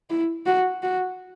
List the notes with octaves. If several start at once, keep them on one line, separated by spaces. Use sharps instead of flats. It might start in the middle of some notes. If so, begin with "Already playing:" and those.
E4
F#4
F#4